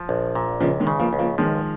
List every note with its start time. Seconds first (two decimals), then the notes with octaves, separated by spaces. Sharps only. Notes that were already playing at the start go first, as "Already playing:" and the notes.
Already playing: F3
0.09 A#1
0.35 A#2
0.60 C#2 C#3 F3
0.80 D#3 G#3
0.87 C#3
0.99 F3 A#3
1.13 C#2
1.19 F3 A#3
1.38 D#3 F3 G#3